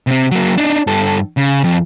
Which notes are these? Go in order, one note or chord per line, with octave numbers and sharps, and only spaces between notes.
C3 C4
F#3 A#3
D4 D#4
G2 A4
C#3
F2